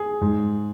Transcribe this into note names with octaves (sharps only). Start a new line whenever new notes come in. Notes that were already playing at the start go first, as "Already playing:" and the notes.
Already playing: G#4
G#2